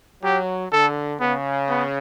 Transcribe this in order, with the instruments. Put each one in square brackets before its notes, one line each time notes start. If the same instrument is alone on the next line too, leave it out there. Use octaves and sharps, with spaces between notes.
[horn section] F#3 [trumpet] G4
[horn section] D3 [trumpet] A4
[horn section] C#3 [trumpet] B3
[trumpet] B3